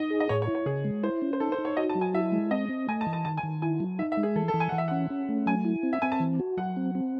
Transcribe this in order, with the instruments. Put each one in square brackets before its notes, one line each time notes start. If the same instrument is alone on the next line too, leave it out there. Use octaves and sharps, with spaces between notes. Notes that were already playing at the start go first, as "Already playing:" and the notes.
Already playing: [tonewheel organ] D#4 [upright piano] D#5
[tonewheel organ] G#4
[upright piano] D#5
[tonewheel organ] A2 [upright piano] C#5
[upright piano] C#5
[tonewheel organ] E4
[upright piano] C#5
[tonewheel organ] C#3 [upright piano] G#4
[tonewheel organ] G#3
[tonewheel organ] E4 [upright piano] C5
[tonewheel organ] C#4
[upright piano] C5
[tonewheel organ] D#4 [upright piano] A4
[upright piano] C5
[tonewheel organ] D#4
[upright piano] C#5
[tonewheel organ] F#4 [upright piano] D#5
[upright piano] A5
[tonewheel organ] F#3
[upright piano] G#5
[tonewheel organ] E4 [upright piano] E5
[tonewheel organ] G#3
[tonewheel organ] C4 [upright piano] D#5
[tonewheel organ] C4
[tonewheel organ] A3 [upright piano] G#5
[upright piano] A5
[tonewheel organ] E3
[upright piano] A5
[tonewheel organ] D#3 [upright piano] A5
[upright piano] G#5
[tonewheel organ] D#3
[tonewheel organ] E4 [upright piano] G#5
[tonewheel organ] F#3
[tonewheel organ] D#4 [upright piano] E5
[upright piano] E5
[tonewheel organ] G#3
[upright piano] G#4
[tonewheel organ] E3 [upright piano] A4
[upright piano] A4
[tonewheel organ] E3
[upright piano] G#5
[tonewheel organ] E3 [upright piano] F#5
[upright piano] E5
[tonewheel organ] C#4 [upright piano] F#5
[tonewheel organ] C#4
A3
[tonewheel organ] F#3 [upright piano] G#5
[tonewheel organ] E4
C4
[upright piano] E5
[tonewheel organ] C4 [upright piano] G#5
[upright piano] A5
[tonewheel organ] E3
F#4
[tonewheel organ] F#3 [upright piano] F#5
[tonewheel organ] C4
C4